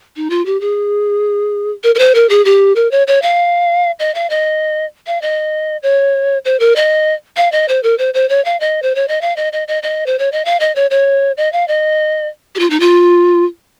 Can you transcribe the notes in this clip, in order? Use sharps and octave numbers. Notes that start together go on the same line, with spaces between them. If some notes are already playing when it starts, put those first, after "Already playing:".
D#4
F4
G4
G#4
A#4
A#4
C5
A#4
G#4
G4
A#4
C#5
C#5
F5
D#5
F5
D#5
F5
D#5
C#5
C5
A#4
D#5
F5
D#5
C5
A#4
C5
C5
C#5
F5
D#5
C5
C#5
D#5
F5
D#5
D#5
D#5
D#5
C5
C#5
D#5
F5
D#5
C#5
C#5
D#5
F5
D#5
G4
F4
D#4
F4